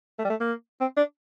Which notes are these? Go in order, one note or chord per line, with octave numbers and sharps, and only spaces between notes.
A3
G3
A3
A#3
C4
D4